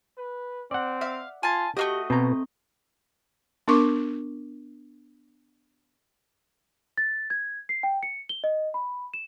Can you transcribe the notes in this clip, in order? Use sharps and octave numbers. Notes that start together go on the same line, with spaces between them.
B4
C4 D5 F#5
E5 F5
F4 G#5 A5
A3 A#3 F#4 G4 D#5
B2 C4 A#5
B3 D4 A#4 C#6 D6
A6
G#6
C7
G5
C#7
G7
D#5
B5
E7